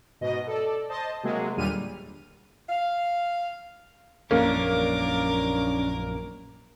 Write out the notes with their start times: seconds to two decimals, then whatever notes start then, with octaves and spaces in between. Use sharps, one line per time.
0.21 G#2 B2 D#5
0.47 A4 D5
0.89 C5 D#5 A5
1.23 C3 F#3 G#3 A#3 G#4
1.57 D#2 A#2 D3 G3 F6 D#7
2.69 F5
4.31 A#1 F#2 E3 A#3 C#4 D4 A#4 D6